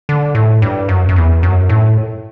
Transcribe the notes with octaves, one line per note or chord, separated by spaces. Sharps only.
D3
A2
G2
F#2
F#2
E2
F#2
A2